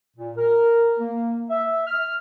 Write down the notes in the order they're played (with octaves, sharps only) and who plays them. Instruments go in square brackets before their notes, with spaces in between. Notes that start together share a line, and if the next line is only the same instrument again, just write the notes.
[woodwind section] A#2
A#4
A#3
E5
F6